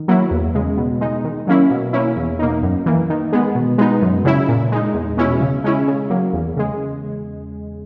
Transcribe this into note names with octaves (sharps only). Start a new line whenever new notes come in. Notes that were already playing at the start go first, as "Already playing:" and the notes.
Already playing: D#3
F#3 A#3 E4
E2
C#3 G#3
B2
G#3 D#4
D#3
F#3 A#3 C#4 E4
B2
A#3 C#4 E4
E2
B2 A#3 D#4
F#2
E3 A#3
D#3
G#3 B3
B2
G#3 B3 D#4
F#2
C#3 F#3 C#4 E4
A#2
G#3 D#4
E2
B2 G#3 C#4 E4
C#3
G#3 C#4 E4
C#3
F#3 A#3
E2
C#3 G#3